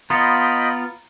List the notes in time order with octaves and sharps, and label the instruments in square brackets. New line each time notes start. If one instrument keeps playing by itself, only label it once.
[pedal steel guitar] B3 F4 [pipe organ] D#5 G5 B5 [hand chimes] A#5 A6 C#7